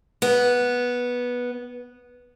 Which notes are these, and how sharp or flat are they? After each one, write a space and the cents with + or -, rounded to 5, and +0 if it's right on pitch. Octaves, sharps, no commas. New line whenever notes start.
B3 -10